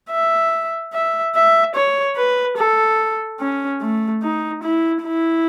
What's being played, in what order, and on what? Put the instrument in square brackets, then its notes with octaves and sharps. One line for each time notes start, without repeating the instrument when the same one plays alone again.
[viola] E5
E5
E5
C#5
B4
A4
C#4
A3
D#4
E4
E4